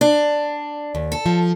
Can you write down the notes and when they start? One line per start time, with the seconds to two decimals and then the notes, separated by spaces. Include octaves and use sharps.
0.01 D4
0.95 D#2
1.12 A4
1.26 F3